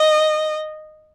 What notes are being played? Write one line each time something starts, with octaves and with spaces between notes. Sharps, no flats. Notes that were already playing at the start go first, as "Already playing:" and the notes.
Already playing: D#5